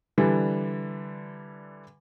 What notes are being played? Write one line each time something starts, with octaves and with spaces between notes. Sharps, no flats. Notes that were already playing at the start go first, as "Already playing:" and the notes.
D3 E3 G3